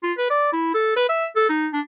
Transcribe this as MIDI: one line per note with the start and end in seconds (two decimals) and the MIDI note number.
0.03 0.13 65
0.18 0.30 71
0.30 0.50 74
0.53 0.70 64
0.74 0.94 69
0.96 1.08 71
1.09 1.26 76
1.36 1.48 69
1.49 1.68 63
1.73 1.80 62